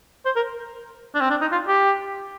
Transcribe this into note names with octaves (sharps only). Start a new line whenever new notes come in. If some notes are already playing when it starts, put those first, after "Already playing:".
C5
A#4
D4
C4
D4
D#4
F4
G4